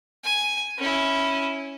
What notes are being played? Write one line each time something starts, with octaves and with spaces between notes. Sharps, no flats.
G#5
C#4 E4